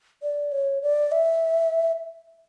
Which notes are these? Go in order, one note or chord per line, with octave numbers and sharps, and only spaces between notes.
D5
C#5
D5
E5